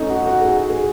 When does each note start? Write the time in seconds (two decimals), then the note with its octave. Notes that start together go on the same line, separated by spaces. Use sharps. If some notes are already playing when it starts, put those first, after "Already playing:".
Already playing: A3 C#4 D#4
0.10 F#4
0.26 F#4
0.41 G#4
0.57 F#4
0.70 G#4